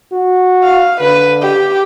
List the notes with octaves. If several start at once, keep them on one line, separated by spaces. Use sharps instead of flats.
F#4
F5
D3 B4
G4